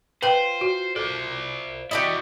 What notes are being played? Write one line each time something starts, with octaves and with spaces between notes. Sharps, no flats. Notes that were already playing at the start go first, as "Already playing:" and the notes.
F4 B4 C5 G5
F#4
A4 C5 D5
E4 F#4 G4 D5 D#5